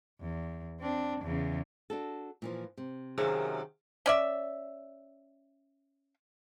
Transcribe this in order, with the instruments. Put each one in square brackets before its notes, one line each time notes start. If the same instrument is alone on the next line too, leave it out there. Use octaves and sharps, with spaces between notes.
[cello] E2
C4 D4
E2 C#3
[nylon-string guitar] D4 F#4 A4
A#2 E3 F3
C3
[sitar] F#2 C3 D#3 [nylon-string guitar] G#4 E5 F5
[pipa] C#4 D5 E5